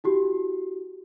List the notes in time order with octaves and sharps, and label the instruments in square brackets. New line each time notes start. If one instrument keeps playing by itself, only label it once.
[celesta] E4 F#4 G4